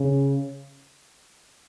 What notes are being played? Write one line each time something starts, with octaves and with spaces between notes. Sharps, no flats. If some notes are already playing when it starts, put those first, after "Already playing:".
Already playing: C#3